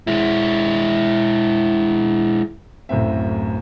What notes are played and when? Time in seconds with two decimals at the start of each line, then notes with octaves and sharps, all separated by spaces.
0.07 G#3 E4
2.89 D1 F#2 A2 C4 E5